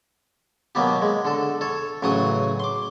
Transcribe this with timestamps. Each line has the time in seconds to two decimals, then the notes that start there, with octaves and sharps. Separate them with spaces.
0.75 B2 F#3 A#3 B3 G4
1.02 G#3
1.25 D3 A4
1.61 A4 C#5
2.03 A1 C#3 F#3 G#5 C#6 D#6
2.60 C6 D6